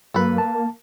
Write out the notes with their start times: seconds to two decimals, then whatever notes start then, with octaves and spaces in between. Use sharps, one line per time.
0.14 G2 F#3 A#3 A4 B4
0.38 A5